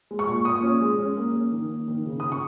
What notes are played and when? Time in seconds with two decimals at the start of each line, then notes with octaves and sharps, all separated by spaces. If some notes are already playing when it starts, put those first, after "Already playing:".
0.11 G#3
0.19 C#6
0.28 A#2
0.45 A#2 D#6
0.63 C#4
0.81 G#3
0.99 C#4
1.17 A#3
1.34 C#4
1.52 D#3
1.69 A#3
1.88 D#3
2.06 C#3
2.20 C#3 D#6
2.32 C#6